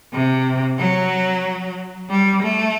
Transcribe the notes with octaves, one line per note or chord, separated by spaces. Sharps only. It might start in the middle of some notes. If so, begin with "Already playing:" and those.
C3
F#3
G3
A3